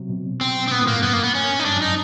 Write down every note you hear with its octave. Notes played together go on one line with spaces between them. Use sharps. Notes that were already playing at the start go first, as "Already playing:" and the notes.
Already playing: C3 F#3
B2
C4
C4
A#2 B3
A2
A#3
G2
F#2 B3
A#3
B3
C#4
D#4
G2 D4
F#2
D#4